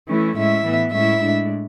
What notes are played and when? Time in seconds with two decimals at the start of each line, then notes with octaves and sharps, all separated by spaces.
0.09 E3 A3 C#4 E4
0.36 A2 G#3 C#4 E4 E5
0.65 A2 E3 B3
0.92 A2 G#3 C#4 E4 E5
1.20 A2 G#3 D4